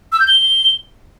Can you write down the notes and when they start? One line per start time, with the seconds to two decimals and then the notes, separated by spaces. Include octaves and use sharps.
0.12 E6
0.20 G6
0.28 G7